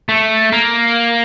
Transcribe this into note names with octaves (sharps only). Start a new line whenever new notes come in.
A3
A#3